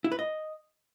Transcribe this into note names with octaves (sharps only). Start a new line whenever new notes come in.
E4
B4
D#5